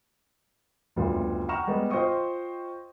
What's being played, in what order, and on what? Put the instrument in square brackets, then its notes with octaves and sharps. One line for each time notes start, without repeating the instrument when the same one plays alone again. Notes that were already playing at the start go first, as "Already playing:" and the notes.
[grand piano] F#1 D2 G3 B3 F4
F#5 G5 A#5 C#6 F6 E7
G3 G#3 B3
F4 C5 D#5 G5 C#6 D#6